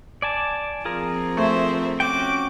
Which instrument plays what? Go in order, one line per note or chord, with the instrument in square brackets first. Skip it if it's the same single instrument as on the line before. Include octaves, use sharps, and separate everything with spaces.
[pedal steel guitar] D5 G#5 A5
[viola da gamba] F3 C4 [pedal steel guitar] F4 G#4 A#4
[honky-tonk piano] A3 [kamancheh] C5 E5
[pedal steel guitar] C#4 F#4 G5 [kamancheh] D6